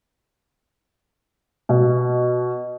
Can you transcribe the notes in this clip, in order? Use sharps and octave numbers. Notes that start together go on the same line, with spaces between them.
B2